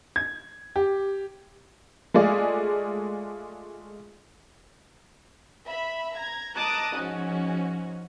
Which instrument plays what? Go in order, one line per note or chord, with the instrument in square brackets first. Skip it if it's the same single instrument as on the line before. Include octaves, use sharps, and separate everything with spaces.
[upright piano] G#6
G4
[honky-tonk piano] G#3 A3 F4 G#4 D5
[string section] E5 B5
A#5 G#6
D#5 A5 A#5 D6 D#6 F#6
G#2 F3 C#4 F#4